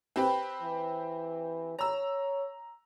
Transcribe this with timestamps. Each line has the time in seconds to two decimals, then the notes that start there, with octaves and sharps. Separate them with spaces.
0.16 C4 G4 B4
0.62 E3
1.79 C#5 A#5 E6